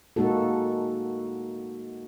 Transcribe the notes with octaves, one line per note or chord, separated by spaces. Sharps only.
G#3 A#3 D#4 F#4 A4